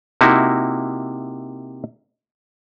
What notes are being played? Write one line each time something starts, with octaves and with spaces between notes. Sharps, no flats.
C3 A#3 D#4 E4 F#4